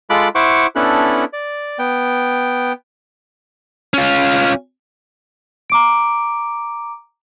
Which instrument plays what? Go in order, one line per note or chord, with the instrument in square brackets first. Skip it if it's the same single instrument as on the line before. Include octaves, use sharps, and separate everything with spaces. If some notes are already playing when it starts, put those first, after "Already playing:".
[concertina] G#3 F4 A4 B5 D6 F#6
E4 C5 F#5 C#6 D6
B3 C#4 D4 E4 A4 F#6
D5
B3 G5
[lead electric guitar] C#4 F4
[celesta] A#5 D6 D7